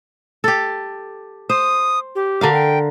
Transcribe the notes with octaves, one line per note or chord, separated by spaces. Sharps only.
G4 A4
C5 D#6
G4
D3 A#4 F5
G5